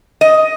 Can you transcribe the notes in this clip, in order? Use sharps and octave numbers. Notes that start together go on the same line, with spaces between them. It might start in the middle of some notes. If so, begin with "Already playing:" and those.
D#5